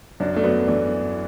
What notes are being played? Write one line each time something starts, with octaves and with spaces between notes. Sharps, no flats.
F#2 D4
A3 D4
F#3 B3
E3 A3 D4